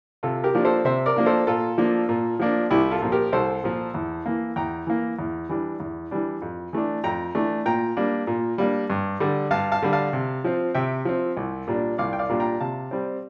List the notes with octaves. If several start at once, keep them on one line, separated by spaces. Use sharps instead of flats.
C3 F4 A4
G4 A#4
F3 A#3 D4
A4 C5
C3 C5 E5
A#4 D5
F3 A#3 D4
A4 C5
A#2 F4 A4
F3 A#3 D4
A#2
F3 A#3 D4
C2 E4 G4
F4 A4
A#2 F3
G4 A#4
C2 A4 C5
A#2 F3
E2
E3 A#3
E2 G5 A#5
E3 A#3
E2
E3 G3 D4
E2
E3 G3 D4
F2
E3 A3 D4
F2 G5 A#5
E3 A3 D4
A#2 G5 A#5
G3 A#3 D4
A#2
G3 A#3 D4
G2
D3 G3
G2 F5 A5
F5 A5
D3 G3
F5 A5
C3
F3 C4
C3 E5 G5
F3 C4
C2
A#2 G3 D4
C2 D5 F5
G5
D5 F5
A#2 G3 D4
G5 A#5
C3 F5 A5
G3 C4